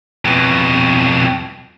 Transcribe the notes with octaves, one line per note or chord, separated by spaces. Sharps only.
F2 B2